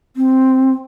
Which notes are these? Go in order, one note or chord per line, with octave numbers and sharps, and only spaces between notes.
C4